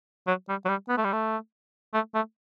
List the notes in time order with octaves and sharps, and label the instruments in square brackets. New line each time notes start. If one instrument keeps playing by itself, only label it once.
[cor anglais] F#3
G3
F#3
G3
B3
A3
G3
A3
A3
A3